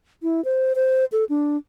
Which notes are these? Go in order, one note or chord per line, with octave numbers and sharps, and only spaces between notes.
E4
C5
C5
A4
D4